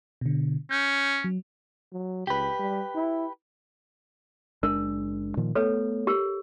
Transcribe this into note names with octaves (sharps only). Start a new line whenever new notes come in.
B2 D3
C#4 G6
F#3
F#3
C#2 G4 B4
G3
E4
F#1 G#3 D4 A#4
A#2 D#3 F3
A3 B3 A4 B4 C#5
G4 A#4